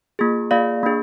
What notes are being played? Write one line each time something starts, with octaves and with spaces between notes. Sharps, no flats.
A#3 F4 G#4
A#3 F4 G#4 D5 F5
A#3 D4 G#4